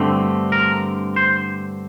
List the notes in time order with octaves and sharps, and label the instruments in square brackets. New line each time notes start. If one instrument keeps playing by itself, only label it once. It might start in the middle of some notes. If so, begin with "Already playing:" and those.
Already playing: [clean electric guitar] G2 D3 A3 C4
A#4
C5